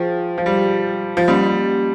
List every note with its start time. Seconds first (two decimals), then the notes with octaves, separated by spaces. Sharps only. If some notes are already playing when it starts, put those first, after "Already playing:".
Already playing: F3 G#4 C5 G5
0.38 F3
0.46 G3
1.17 F3
1.28 G3 A#3 C#4 G4